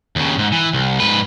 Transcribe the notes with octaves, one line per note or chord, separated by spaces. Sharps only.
D#2 C#3
G#2
E3
C2
G#2 B4